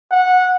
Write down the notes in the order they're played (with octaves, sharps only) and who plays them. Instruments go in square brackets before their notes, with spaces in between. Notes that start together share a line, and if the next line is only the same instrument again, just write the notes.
[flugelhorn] F#5